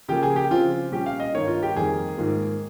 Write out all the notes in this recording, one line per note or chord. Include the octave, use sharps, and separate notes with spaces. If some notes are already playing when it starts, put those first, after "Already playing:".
C#3 F3 A#3 G4
G#4
G4
C#3 F3 C4 F4
A#2 G3 C#4 G4
F5
D#5
G2 D#3 A#3 D#4 C#5
F4
G4
F2 D#3 G3 A#3 G#4
G#2 D#3 A#3 F4